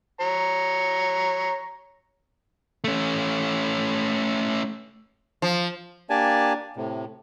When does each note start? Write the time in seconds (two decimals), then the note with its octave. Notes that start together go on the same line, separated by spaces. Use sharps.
0.20 C#5 A#5
2.84 A3 C#4
5.42 F3
6.10 A#3 D4 G4 D5 G#5 A5
6.77 A2 C3